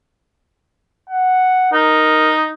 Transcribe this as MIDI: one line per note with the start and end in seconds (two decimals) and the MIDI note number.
1.10 1.70 78
1.73 2.50 63
1.73 2.34 70